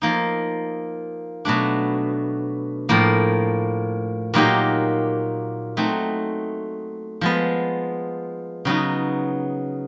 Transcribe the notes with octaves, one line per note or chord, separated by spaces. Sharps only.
F3 A#3 D#4
B2 F#3 A3 D4
A2 F3 A#3
A#2 F#3 A#3 D#4 G4
F#3 A3 C4 D#4
F3 G#3 B3
C#3 F#3 B3 D#4